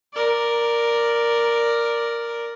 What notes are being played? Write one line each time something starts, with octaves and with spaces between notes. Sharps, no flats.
A#4 D5